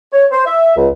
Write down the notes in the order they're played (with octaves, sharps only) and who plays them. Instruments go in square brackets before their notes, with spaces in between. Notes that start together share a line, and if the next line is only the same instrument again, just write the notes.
[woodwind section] C#5
C5
E5
C#2